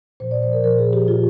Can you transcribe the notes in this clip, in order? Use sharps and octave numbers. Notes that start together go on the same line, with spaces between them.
A#2 F3 C5
D5
C5
A#4
A#2 F3 A#4
G#4
G4
A#2 F3 F4